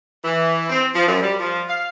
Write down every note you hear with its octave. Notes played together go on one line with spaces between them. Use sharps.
E3
C4
F3
F#2
G3
F3
F5